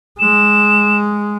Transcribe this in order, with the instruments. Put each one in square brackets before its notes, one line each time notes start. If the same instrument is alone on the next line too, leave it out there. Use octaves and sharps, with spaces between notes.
[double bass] G#3 [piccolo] E7